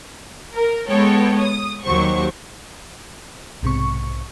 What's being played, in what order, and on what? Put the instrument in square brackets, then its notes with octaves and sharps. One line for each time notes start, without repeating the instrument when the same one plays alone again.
[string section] A#4
G#3 B3 A4 C#5 G5
D#6
D#2 F#3 G4 C5 C#6
[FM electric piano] B1 G#2 C3 C#6